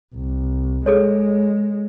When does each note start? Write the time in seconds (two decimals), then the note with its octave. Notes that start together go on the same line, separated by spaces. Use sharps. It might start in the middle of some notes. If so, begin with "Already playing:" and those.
0.15 C2
0.86 G#3 G#4 A4 C#5